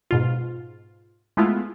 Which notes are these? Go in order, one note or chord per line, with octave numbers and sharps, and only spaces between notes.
G#2 B2 F4
G#3 A3 B3 E4 F4